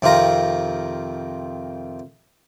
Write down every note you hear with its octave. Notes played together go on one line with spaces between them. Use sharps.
F2 C3 D#3 F4 A#5